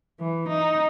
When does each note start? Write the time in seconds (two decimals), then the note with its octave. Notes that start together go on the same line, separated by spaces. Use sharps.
0.20 E3
0.49 D#4